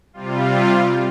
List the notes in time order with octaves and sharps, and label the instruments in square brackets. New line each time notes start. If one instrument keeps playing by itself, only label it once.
[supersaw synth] C3 G3 F4